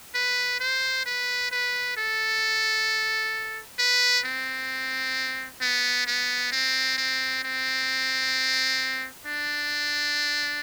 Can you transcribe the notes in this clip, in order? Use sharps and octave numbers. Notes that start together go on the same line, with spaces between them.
B4
C5
B4
B4
A4
B4
C4
B3
B3
C4
C4
C4
D4